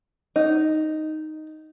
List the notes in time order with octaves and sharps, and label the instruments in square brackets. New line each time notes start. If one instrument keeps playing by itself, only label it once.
[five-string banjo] D#4